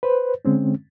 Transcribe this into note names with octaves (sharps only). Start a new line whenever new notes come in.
B4 C5
D3 G#3 C4 C#4